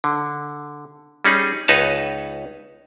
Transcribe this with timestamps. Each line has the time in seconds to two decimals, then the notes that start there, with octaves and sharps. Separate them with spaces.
0.04 D3
1.25 G3 C#4 D#4 G#4
1.68 C#2 D#4 B4 C#5 A5